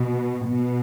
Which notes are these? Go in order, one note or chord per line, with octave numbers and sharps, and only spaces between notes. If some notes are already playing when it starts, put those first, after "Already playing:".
Already playing: B2
B2